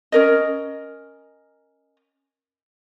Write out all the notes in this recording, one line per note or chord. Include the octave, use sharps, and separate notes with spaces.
C#4 A#4 D#5